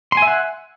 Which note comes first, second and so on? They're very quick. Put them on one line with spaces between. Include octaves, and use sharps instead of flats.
C6 G#5 E5 F#5